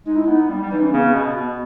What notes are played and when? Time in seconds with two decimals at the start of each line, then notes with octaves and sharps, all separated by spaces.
0.06 G#3 D#4
0.15 E4
0.25 B3 D#4
0.49 G3
0.62 G3
0.71 E3 D#4
0.82 C#4
0.92 C#3 B3
1.04 C#4
1.15 B2
1.36 B2 B3